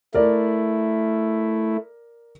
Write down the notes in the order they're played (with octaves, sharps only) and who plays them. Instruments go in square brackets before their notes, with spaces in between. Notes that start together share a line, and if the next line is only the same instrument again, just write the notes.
[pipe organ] A3 E4 [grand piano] A#4 D5